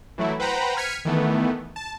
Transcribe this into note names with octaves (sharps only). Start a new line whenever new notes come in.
E3 F#3 A3 E4
B4 C5 F#5 G5 A#5 B5
F6 G#6 B6 C#7 D#7
D#3 E3 A3 B3
A5